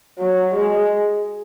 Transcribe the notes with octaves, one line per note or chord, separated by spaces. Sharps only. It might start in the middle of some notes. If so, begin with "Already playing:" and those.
F#3
G#3